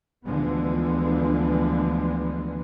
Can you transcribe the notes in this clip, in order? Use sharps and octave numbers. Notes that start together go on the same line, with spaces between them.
D2 D3 E3 F3 G#3 B3